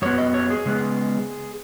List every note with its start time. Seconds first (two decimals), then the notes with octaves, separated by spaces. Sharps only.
0.02 F#2 F#3 B3 C#5
0.18 D#5
0.34 C#5
0.50 G#4
0.66 C#3 G#3 B3